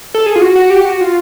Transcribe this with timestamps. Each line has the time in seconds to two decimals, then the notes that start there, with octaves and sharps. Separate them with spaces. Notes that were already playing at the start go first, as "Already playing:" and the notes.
0.14 A4
0.26 G#4
0.36 F4
0.41 F#4
0.55 F#4
0.70 G4
0.85 F#4
1.01 F4